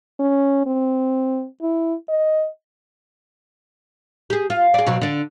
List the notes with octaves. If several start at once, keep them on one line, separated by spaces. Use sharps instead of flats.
C#4
C4
E4
D#5
G4 G#4
F4
G#4 D5
B2 F#3 C4
D3 D4